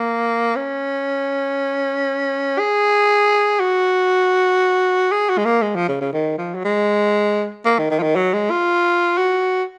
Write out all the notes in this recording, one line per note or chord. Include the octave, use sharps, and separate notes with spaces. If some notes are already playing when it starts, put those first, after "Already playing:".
Already playing: A#3
C#4
G#4
F#4
G#4
F#4
G#3
A#3
G#3
F3
C#3
C#3
D#3
F3
F#3
G#3
A#3
D#3
D#3
F3
D#3
F#3
G#3
F4
F#4